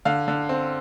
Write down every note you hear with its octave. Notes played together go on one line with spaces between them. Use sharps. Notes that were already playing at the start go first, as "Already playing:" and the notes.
D3 F5
D3
C4